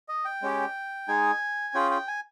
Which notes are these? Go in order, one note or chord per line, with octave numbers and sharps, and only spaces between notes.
D#5
G5
G#3 C#4 G4
G#3 D#4 G#4 G#5
C#4 F4 G#4 G5
G5
G#5